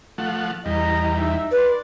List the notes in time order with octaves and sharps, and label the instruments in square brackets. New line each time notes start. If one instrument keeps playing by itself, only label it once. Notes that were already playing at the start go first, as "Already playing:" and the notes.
[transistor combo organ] F3 A3 F#5
[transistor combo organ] E2 G3 [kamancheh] D#5 A#5
[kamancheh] D#4 E5
[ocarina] B4 [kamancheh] D5 C6